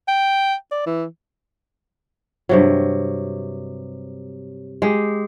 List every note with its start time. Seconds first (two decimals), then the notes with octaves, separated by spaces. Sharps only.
0.08 G5
0.72 D5
0.87 E3
2.49 G2 C3 F#3
4.82 G#3 G4